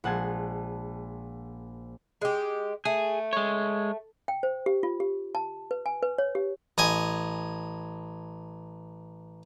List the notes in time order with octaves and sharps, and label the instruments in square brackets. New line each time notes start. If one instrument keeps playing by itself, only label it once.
[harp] A#1 G#3 F#5 A5 G#6 C7
[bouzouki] G#3 G4
[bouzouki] A3 [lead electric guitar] G#4
[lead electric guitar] G#3 C#5
[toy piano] G5
C5
G4
F4
G4
A5
B4
G#5
B4
C#5
G4
[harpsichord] A1 D#5 G#5